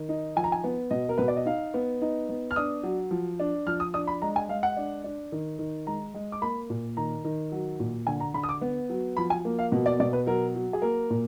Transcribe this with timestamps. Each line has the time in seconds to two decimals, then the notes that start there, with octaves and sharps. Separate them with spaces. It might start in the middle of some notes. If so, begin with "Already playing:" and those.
Already playing: D#3
0.09 D#4
0.36 F3 G#5
0.44 A#5
0.52 G#5
0.64 B3
0.91 B2 D#5
1.09 A#4
1.18 B2 B4
1.28 D5
1.37 D#5
1.46 D#4 F5
1.74 B3
2.02 D#4
2.29 B3
2.51 F6
2.56 D4 D#6
2.83 F#3
3.11 F3
3.40 D4
3.66 F3 F6
3.80 D#6
3.94 D4 D#6
4.07 B5
4.22 G#3 A#5
4.36 G#5
4.49 G#3 F5
4.63 F#5
4.77 D4
5.04 D4
5.32 D#3
5.59 D#3
5.87 G#3 A#5
6.14 G#3
6.32 D6
6.42 A#3 B5
6.70 A#2
6.97 D#3 A#5
7.25 D#3
7.52 F#3
7.80 A#2
8.07 D3 G#5
8.20 A#5
8.34 D3 B5
8.43 D#6
8.49 D6
8.61 B3
8.89 F#3
9.17 F3 B5
9.30 G#5
9.45 A#3
9.59 F5
9.72 B2
9.86 D5
10.00 B2 D5
10.13 B4
10.27 F#3 A#4
10.55 F#3
10.73 G#4
10.82 A#3 A#4
11.10 A#2